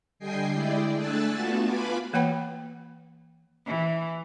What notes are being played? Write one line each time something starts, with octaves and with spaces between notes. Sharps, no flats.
D3 G3 D#5 G5 G#5 C7
G#3 E4 G#4 D5 G5
A3 D4 G#5 E6 F#6 A6
A3 B3 F4 F#4 A4 E5
F4 B4 G#5 B5 D6
E3 A#3 C#5 F#5 G5 B5
E3